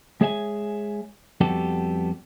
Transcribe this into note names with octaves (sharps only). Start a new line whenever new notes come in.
G#3 G#4 C#5 E5 F5 G#5
F2 G3 B3 F#4 G4 A4